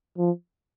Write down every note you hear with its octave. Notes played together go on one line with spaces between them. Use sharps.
F3